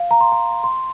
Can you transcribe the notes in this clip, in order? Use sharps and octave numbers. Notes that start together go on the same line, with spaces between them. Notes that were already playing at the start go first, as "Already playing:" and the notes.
Already playing: F5
A#5
C6
A#5
C6